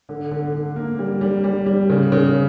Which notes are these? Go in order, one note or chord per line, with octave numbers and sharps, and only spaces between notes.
D3
D3
D3
A#3
G3
G3
G3
G3
C#3
C#3